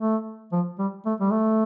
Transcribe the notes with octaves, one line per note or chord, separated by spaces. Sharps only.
A3
F3
G3
A3
G3
A3